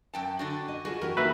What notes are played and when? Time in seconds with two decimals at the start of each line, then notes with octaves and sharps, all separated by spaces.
0.14 F#2 G5 A5
0.39 D3 D4 F#4
0.68 D#5
0.85 F4 F#4 G#4 B4
1.01 E3 F#4 G4 A#4
1.17 D#3 A#3 F#4 B4 E5